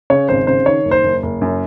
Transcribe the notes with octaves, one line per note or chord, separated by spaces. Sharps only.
C#3 C#5
G#1 C5
C#3 C5
D#3 C#5
F#1
C5
F#1
F#1
F#2